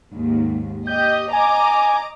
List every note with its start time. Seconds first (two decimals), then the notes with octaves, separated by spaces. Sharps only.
0.11 D#2 G#2
0.87 G4 D#5 G6
1.33 D#5 G#5 A#5 D6